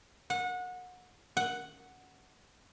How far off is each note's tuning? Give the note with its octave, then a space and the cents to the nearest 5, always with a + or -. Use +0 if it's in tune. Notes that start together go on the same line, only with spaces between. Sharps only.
F#5 -25
F#5 +0